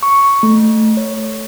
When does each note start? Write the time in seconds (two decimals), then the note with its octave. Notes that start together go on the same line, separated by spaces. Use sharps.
0.03 C#6
0.43 A3
0.97 C#5